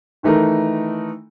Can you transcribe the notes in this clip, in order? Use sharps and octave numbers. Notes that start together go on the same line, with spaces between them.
D#3 E3 A3 D#4 A#4